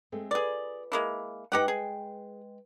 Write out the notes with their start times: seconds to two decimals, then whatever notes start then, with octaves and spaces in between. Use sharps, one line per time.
0.12 G#3 A3 C4
0.31 F4 G#4 B4 D5
0.92 G#3 A#3 E4
1.52 G#3 D#4 G4 B4 F#5 G5
1.68 G#4